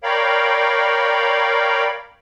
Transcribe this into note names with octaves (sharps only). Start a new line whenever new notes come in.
A#4 C#5 D5 F5 G5 B5